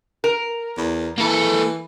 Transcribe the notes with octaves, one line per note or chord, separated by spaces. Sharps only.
A#4
E2
E3 A#3 A4